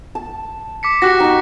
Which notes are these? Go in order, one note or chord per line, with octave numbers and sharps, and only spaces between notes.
A5
D6 B6 C#7
F#4 G4 D6 F#6 A#6
D#4 D#5